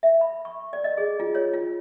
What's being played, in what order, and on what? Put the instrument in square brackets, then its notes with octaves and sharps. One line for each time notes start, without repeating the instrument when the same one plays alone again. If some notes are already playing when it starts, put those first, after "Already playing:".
[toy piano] E5
B5
C#6
D5
D#5
G#4
F4
C#5
F4